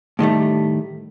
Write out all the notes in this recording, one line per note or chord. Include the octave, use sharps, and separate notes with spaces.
A2 D#3 G3 A3